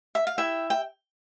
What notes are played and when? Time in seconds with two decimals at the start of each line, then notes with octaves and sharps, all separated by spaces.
0.15 E5
0.27 F5
0.38 E4 E5 G5
0.70 G5